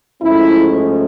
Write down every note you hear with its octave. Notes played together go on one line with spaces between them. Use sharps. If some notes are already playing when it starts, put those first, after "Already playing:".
G#2 F3 A3 C#4 E4